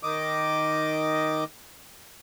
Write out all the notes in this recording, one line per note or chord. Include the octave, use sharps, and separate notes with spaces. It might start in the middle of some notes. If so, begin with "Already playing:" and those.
D#3 D#5 D6